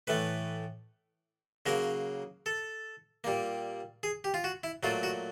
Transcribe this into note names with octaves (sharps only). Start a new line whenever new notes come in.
A2 E3 A3 B4
C#3 F#3 A#3 A#4
A4
A#2 G3 A#3
G#4
G4
F4
F#4
E4
A#2 F#3 A3 F4
F#4